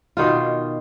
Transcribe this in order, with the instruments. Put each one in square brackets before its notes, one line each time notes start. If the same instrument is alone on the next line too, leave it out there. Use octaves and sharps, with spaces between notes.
[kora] B2 D#3 F4